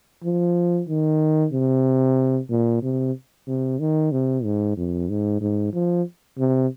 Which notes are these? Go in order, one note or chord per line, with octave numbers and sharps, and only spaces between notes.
F3
D#3
C3
A#2
C3
C3
D#3
C3
G#2
F2
G#2
G#2
F3
C3